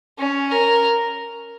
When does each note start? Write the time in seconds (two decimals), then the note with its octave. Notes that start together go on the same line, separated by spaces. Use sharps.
0.18 C#4
0.51 A#4